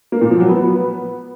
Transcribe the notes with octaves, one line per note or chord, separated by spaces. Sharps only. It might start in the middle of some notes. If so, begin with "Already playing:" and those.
A#3
A#2
F3
F#3
B3